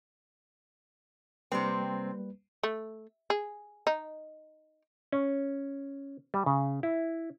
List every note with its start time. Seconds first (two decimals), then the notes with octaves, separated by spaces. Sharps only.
1.52 C3 G3 A#3 C4 B4
2.63 A3
3.30 G#4
3.87 D#4
5.12 C#4
6.34 G3
6.46 C#3
6.83 E4